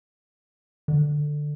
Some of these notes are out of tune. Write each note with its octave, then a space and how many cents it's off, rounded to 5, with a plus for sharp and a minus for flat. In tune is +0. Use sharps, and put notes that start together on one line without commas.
D3 +10